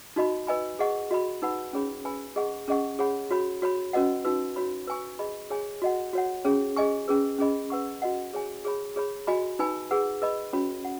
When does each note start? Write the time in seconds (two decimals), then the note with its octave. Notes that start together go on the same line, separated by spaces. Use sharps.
0.16 D#4 F#4 D#5 B5
0.47 B4 D#5 G#5 B5
0.79 G#4 D#5 F#5 C#6
1.11 F#4 D#5 B5
1.42 D#4 B4 F#5 B5
1.73 C#4 G#4 C#5 B5
2.05 B4 G#5 B5
2.36 G#4 D#5 F#5 C#6
2.68 C#4 G#4 D#5 F#5 C#6
2.99 G#4 C#5 F#5 B5
3.31 F#4 C#5 B5
3.62 F#4 C#5 B5
3.93 C#4 F#4 B4 D#5 F#5
4.24 D#4 F#4 B4
4.56 F#4 C#5 B5
4.87 B4 G#5 C#6
5.19 G#4 D#5 B5
5.50 G#4 C#5 G#5
5.82 F#4 D#5 F#5
6.13 F#4 C#5 F#5
6.45 C#4 G#4 C#5
6.76 G#4 D#5 G#5 C#6
7.08 C#4 G#4 B4
7.39 C#4 G#4 D#5 B5
7.70 B4 F#5 C#6
8.02 F#4 D#5 F#5
8.33 G#4 C#5 G#5
8.65 G#4 C#5 B5
8.96 G#4 C#5 B5
9.27 F#4 D#5 G#5 B5
9.59 D#4 B4 G#5 B5
9.91 G#4 B4 F#5
10.22 B4 D#5 B5
10.53 C#4 F#4 C#5 B5
10.85 F#5